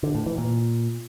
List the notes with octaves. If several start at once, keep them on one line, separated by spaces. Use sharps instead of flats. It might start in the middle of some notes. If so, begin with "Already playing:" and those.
D3
A2
E3
A#2